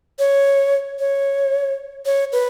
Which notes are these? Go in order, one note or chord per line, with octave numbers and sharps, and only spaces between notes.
C#5
C#5
C#5
B4